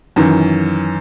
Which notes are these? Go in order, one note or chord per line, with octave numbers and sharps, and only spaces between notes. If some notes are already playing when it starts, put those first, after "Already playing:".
F#2 D#3 E3